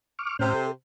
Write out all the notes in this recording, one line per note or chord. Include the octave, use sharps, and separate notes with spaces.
C#6 D6 F6
A2 C3 C#4 C5 F6
A4